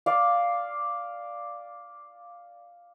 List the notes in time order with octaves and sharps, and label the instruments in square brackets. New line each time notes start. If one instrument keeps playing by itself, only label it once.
[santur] D5 F5